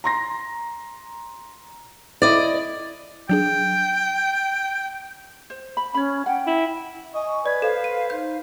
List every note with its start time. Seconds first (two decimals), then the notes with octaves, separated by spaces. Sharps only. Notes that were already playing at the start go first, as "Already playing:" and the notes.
0.04 A#5 C6 A#6
2.22 E4 D5 D#5
3.29 F#3 D4 G#4 G5
5.50 C5
5.77 B5
5.94 C#4 C#5 B5
6.26 C#4 F#5 G5
6.47 E4
7.15 D#5 G#5 C#6
7.46 B4 D5 G#6
7.62 A4 C5 F5
7.84 D#7
8.10 D#4 C5 F5 G6